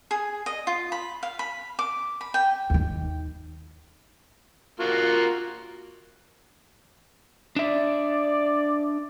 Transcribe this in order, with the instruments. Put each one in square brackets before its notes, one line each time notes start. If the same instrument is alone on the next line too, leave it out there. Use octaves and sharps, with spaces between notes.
[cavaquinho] G#4
D#5
F4
B5
F5
B5
D6
B5
G5
[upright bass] D#2 D#3
[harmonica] A#3 F4 F#4
[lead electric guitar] D4 E5 [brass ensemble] D5